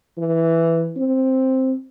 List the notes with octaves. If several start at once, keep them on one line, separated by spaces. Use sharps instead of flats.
E3
C4